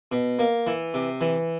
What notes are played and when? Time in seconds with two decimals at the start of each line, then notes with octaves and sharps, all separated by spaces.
0.12 B2
0.39 A#3
0.67 E3
0.94 C3
1.21 E3